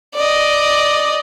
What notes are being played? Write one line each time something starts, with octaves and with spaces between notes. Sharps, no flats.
D5 D#5